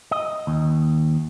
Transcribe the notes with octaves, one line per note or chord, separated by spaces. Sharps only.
D#5
D#2